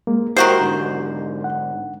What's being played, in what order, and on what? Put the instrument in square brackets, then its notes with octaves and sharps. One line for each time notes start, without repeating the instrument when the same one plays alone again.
[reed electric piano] G#3 A#3
[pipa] D#3 F#4 C5 [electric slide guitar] E4 A#4 [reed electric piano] G4
[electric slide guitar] G#2 D3
[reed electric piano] F#5